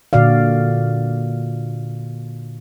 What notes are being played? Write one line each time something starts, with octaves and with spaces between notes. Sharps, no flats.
A#2 D3 F#4 D5 F5